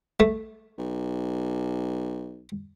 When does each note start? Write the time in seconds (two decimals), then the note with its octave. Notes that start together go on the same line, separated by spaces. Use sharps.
0.20 A3
0.78 B1